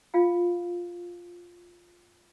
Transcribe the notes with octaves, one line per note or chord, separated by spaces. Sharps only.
F4 F5 G5